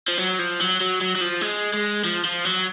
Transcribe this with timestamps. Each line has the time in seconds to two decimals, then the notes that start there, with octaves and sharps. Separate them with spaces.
0.08 F3
0.17 F#3
0.39 F3
0.60 F#3
0.80 F#3
1.01 F#3
1.15 F#3
1.21 F3
1.41 G#3
1.73 G#3
2.04 F3
2.24 F3
2.45 F#3